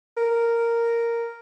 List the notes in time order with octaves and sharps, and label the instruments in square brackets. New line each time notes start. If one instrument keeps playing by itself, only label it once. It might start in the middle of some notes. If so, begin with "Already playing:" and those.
[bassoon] A#4